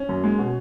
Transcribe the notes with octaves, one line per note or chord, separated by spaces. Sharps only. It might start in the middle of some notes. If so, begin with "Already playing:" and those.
Already playing: C#4
F#2
G#3
B2